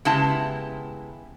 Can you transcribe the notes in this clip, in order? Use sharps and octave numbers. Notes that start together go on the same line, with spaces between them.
C#3 G#3 B3 E4 G4 A5